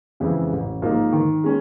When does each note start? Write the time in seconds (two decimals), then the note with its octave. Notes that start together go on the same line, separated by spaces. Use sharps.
0.20 F2 C#3 E3 G#3
0.52 A1
0.82 G#2 F3 A#3 D#4
1.12 D#3
1.44 G#3 C#4